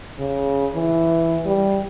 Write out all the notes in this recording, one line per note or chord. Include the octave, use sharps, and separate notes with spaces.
C#3
E3
G3